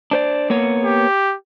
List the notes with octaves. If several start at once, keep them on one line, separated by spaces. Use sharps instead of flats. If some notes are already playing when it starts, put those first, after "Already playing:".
D4 C5 D5
A#3 B3 C#5
G4